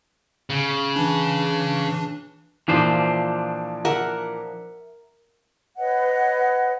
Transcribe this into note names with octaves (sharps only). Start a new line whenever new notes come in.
C#3
E3 D4
A#2 E3 F3 D4 C5
A#4 E5 F#5
B4 C#5 D#5 F#5